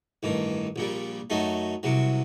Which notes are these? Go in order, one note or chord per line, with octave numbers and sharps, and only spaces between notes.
A1 G2 D#3
A#1 A#2 G3
F#2 F#3 A3 D#4
C2 C3 F#3